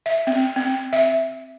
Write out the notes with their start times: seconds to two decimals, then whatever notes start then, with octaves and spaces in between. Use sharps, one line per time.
0.06 E5
0.27 C4
0.56 C4
0.93 E5